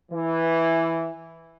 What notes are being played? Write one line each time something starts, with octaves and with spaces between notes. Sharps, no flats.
E3